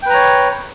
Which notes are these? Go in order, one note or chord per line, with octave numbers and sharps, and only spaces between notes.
B4 C#5 G5 A#5